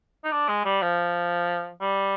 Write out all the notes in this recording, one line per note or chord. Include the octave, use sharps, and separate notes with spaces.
D#4
D4
G#3
G3
F3
G3